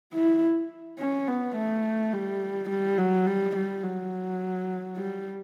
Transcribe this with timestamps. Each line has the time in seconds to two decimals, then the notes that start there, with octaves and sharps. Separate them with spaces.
0.14 E4
0.99 C#4
1.28 B3
1.55 A3
2.13 G3
2.70 G3
2.98 F#3
3.26 G3
3.56 G3
3.83 F#3
4.97 G3